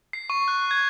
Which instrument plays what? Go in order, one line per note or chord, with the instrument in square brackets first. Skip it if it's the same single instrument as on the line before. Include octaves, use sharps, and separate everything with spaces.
[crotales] C7
C#6
F#6
G#6